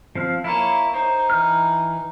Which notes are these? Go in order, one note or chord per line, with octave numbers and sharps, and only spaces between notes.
F3 C4 F5
A#3 E4 C#5 A5
D#4 C5
E3 F6